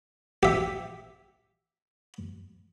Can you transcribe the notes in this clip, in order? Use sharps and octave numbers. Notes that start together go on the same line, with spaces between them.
G4 E5